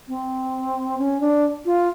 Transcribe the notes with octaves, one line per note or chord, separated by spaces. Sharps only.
C4
C#4
D4
F4